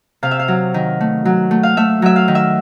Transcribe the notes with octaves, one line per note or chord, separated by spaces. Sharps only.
C3 F5
E5
F5
F#3
D#3
A3
F#3
A3
F5
A3 E5
F#3 E5
F5
D#3
E5